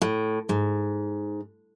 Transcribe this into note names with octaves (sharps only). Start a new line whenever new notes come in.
A2
G#2